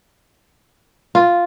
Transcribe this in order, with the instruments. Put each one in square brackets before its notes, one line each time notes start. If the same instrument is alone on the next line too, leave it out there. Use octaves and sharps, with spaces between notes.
[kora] F4